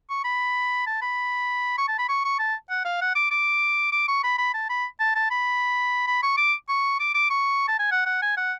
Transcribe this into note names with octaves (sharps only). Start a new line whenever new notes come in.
C#6
B5
A5
B5
C#6
A5
B5
C#6
C#6
A5
F#5
F5
F#5
D6
D6
D6
C#6
B5
B5
A5
B5
A5
A5
B5
B5
C#6
D6
C#6
D6
D6
C#6
A5
G#5
F#5
F#5
G#5
F#5